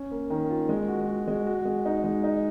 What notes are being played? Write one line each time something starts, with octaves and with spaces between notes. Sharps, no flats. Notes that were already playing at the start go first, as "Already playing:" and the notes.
Already playing: C#4
A#3
D#3
F4
G#3
F#4
F#4
G#3
F#4
G#3
D#4
G#3
D#4